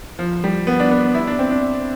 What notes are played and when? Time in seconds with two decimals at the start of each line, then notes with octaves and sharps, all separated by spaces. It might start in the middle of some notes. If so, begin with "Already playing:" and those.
0.19 F3
0.44 G3
0.67 B3
0.80 D4
0.91 B3
1.04 B3
1.14 E4
1.27 D4
1.39 C4
1.51 D4